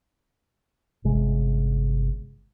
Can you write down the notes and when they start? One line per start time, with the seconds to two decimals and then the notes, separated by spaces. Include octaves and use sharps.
1.04 G1 C3 G#3